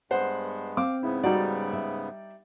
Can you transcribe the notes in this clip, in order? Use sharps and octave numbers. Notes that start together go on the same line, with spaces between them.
G2 G#3 B3 C5 F#5
C4 F5 D6
G#2 C#3 B3 E4
G3 D#4 F#4 D5
E5